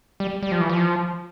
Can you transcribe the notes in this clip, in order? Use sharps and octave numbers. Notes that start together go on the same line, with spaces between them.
G3
G3
F3
E3
F3